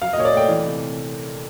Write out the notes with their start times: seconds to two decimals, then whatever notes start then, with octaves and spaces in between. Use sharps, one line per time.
0.02 F#3 F5
0.13 D#5
0.18 A#2 C#5
0.25 D5
0.33 A3 G5
0.48 E3
0.64 C3